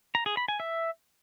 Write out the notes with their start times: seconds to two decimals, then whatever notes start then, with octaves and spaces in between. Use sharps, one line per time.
0.15 A#5
0.26 G#4
0.37 B5
0.48 G#5
0.60 E5